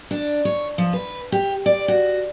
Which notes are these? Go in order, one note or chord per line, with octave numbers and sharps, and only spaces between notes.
D4
C#5
F3
B4
G4
D5
F#4